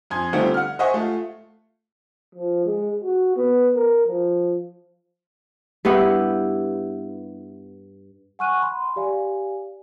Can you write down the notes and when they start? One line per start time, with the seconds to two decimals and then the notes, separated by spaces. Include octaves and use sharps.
0.10 F2 G#5 C6 G#6
0.33 D3 G3 A3 C4 D#4 F4
0.54 F#5 F6
0.79 C5 D#5 E5 F#5 G#5 C#6
0.94 A3 F4
2.35 F3
2.65 G#3
3.04 F#4
3.36 B3
3.75 A#4
4.06 F3
5.85 G2 B3 E4 G4
8.39 F#5 G#5 C#6 F6 F#6 D#7
8.62 B5 C6
8.96 G4 D5 F5 G#5